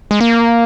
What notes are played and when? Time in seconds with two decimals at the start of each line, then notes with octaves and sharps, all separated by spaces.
0.11 G#3
0.21 A#3